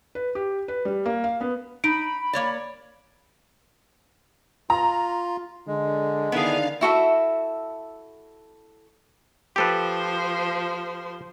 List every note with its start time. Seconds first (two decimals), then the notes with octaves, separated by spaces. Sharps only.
0.15 B4
0.35 G4
0.68 B4
0.85 G3
1.06 A#3
1.24 F5
1.41 B3
1.84 D#4 B5 D7
2.33 A#3 C#5 D5
4.70 F4 A#5
5.67 D3 G#3
6.32 D3 D#3 B3 D4 E4 G#4 F5
6.81 E4 F#4 A4 E5
9.56 F3 G4 A4 B4 C5